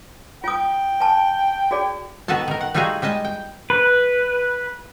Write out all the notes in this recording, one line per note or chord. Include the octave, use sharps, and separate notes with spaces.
F4 G5 D#6
G#5 A5
F#4 G#4 D5
D#3 B3 F#4 A4 A5
D#3 A#4
F#5
G3 A3 D#4 F4 F#4 G#4
G3 G#3 D#5 A5
G5
B4